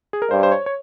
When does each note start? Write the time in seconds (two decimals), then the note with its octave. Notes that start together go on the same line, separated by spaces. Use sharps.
0.13 G#4
0.22 A#4
0.31 G2 C5
0.43 C5
0.52 C#5
0.66 C#5